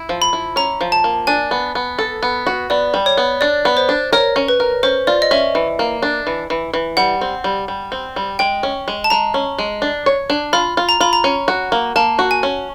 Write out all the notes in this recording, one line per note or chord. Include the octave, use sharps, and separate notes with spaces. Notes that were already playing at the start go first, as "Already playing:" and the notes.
Already playing: E4
F3
B5
E4
C#4 A#5
F3
A5
A#3
D4 G#5
B3
B3
A4
B3
F#4
B3 D5
G3
C#5
B3
D4 D5
B3
C5
D4
A#4 C#5
C#4
B4
A#4
C#4 C5
F4 D5
D#5
C#4 E5
E3
A#3
D4
E3
E3
E3
G3 F#5
C4
G3
G3
C4
G3
G#3 G5
C#4
G#3
A5
G#3 A#5
C#4
G#3
D4
C#5
D4
F4 B5
F4
A#5
F4 B5
A#5
C#4
F#4
A#3
A#3 A5
F#4
G#5
C#4